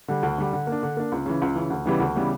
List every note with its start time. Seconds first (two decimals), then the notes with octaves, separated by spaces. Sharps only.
0.08 D3 G3
0.23 D2
0.38 D3 G3
0.53 D3
0.67 A#3
0.72 D4
0.83 D3
0.97 A#3 D4
1.12 C#2
1.26 C#3 E3
1.42 C#2
1.55 C#3 E3
1.70 D2
1.86 C#3 E3 G3 B3
2.00 D2
2.16 C#3 E3 G3 B3